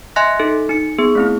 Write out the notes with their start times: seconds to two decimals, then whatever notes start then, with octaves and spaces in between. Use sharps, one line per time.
0.16 D#5 E5 G#5 C6 F#6 A#6
0.40 D#4 A4
0.69 D#4 C#7
0.99 B3 G#4
1.15 A3 C4 E4